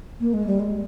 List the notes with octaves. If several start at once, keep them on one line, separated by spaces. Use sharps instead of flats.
A#3
G#3
G3
G#3